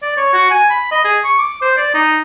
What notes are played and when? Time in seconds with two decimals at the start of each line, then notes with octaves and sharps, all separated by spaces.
0.02 D5
0.17 C#5
0.33 F#4
0.51 G#5
0.70 B5
0.91 D#5
1.04 G#4
1.24 C#6
1.38 D6
1.61 C5
1.77 D5
1.94 D#4